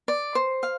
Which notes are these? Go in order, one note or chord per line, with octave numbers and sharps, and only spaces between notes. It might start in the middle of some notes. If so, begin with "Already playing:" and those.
D5
C5
F5